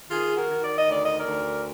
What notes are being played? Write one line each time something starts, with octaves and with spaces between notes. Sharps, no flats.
D#3 F4 G#4
F#4 A#4
D#3
D5
D#5
D2 D5
D#5
A#4 D5
D2